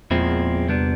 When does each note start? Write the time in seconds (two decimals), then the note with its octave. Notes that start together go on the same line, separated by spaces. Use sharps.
0.11 E2 A#2 F3 G#3 C4 E4
0.68 C2 A#2 G3 B3 D4